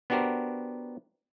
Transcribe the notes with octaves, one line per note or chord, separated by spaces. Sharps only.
B3 D4 F#4 G4 A#4 C5